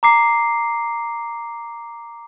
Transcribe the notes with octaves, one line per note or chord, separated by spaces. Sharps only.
A#5 D6 C7